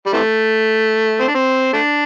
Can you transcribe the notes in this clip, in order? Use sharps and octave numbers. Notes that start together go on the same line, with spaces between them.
G3
C3 E3 A3
C4
D4
C4
A3 D4